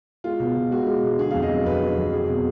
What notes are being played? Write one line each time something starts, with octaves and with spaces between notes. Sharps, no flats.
G#3 F4
B2
B2
G#3 F#4
G#3
B2
D3 G#4
F2 F5
D#5
F#3
F2 B4
D3
F2
F#3 G#4
B2